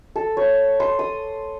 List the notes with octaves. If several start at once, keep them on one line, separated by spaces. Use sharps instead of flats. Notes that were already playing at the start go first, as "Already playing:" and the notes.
A4
C#5
C6
D#6